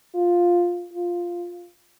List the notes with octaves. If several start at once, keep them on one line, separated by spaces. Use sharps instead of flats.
F4
F4